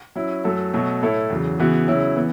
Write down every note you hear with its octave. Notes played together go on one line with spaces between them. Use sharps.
F#3 C#4 E4
F#2 F#3 A3 F#4 A4
B2 F#3 A3
A2 A3 E4 A4 C#5
E2 C#3 F#3
C#3 E3 B3 F#4
C#3 F#3 C#4 E4 C#5
E3 B3